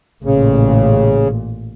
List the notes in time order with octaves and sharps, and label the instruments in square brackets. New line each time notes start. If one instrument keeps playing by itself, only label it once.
[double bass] A1 A#2 [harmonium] C#3